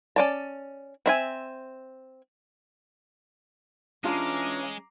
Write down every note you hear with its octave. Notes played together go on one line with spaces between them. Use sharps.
C#4 D5 A5
C4 E5 G#5
E3 G#3 C#4 D4 F4 A#5 D6